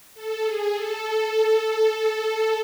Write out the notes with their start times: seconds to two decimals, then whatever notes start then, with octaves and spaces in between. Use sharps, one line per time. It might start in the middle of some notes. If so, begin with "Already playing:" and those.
0.15 A4
0.44 G#4
0.73 A4